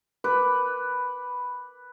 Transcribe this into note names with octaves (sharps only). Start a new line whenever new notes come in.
B4 D6